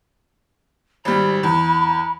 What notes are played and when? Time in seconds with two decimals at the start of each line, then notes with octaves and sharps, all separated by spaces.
1.05 G#1 G3 B5
1.43 E2